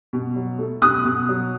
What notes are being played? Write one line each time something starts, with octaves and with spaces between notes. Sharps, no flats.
B2
F#3
A3
B2 D#6 F#6
B2
F#3